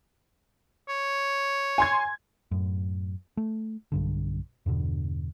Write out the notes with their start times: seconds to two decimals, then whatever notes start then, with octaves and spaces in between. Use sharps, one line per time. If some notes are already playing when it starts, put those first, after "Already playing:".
0.89 C#5
1.78 G#5 C6 G#6
2.51 F#2 A2
3.37 A3
3.92 B1 G2 D3
4.66 E2 G2 B2 D3